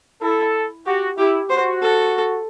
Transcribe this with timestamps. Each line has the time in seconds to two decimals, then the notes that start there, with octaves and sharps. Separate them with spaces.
0.22 E4 A4
0.86 F#4 G4
1.18 E4 G4
1.50 F#4 C5
1.82 A4